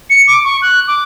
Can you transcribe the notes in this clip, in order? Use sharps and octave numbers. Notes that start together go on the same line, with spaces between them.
C#7
D6
C#6
F#6
D6